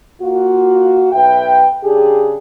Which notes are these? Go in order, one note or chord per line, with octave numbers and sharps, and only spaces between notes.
A#3 F4 F#4
B1 B4 E5 G5
C#3 D4 G4 G#4